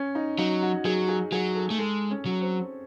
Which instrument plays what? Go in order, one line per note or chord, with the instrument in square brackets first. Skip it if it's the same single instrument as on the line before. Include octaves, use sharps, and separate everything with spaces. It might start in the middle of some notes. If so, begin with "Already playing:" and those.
Already playing: [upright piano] C#4
D#4
[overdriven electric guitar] F#3 [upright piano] D#4
[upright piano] F#4
[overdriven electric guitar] F#3 [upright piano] G#4
[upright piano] G#4
[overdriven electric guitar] F#3 [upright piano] G#4
[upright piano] A4
[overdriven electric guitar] A3
[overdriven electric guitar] G#3 [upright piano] A4
[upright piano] C#4
[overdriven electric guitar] F#3
[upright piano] C4